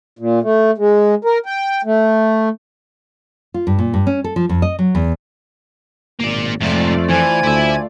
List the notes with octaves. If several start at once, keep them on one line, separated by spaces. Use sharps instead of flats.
A#2
A3
G#3
A#4
G5
A3
F4
G2
A#2
G2
C#4
A4
F3
F2
D#5
F#3
E2
G#1 A#3 D5
F2 G#2 C3 A3 F4 D5
E3 C5 G#5 G#6
D2 E4 E5